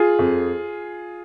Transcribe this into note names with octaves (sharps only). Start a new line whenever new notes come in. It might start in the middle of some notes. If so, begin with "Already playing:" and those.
Already playing: F4 G#4
F2